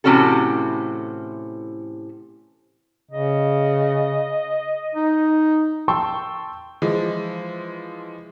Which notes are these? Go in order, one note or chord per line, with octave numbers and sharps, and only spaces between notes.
A2 C3 E3 C#4 F#4 A4
C#3 D#5
D#4
G5 A5 C6 C#6 E6
E3 F3 G#3